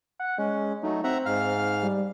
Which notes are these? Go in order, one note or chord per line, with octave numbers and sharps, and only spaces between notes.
F#5
G#3 C#4
F#3 A3 D#4
C4 E5 F#5 A#5
G#2 F5 F6
G3